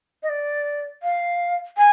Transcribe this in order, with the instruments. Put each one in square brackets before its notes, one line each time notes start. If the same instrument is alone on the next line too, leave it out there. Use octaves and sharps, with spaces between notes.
[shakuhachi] D#5
D5
F5
G#5